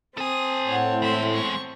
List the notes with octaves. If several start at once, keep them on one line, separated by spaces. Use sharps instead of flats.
C4 A4 G#5 A5 D#6
A2 C#5 F#5
E2 G#3 E5
C#6